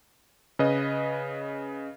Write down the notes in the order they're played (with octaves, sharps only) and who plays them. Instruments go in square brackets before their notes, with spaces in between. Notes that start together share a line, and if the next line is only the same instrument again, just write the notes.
[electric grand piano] C#3 B4 D#5